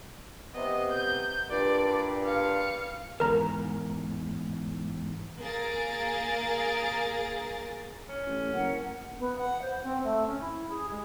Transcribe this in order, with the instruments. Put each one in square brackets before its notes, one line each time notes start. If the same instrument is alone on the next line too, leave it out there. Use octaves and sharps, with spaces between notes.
[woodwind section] C3 B3 [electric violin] D#5
[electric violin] G6
[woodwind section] G2 A#2 [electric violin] D5
[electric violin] F5 C#7
[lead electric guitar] E2 G#2 [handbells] A#4 A#5
[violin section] A#3 G#4 A#4 A6
[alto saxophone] C#4
[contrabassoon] A1
[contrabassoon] F#1 [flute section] A#4 F#5
[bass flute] B3
F#5
C5
C4
A3
C#4
E4
G#4
G#3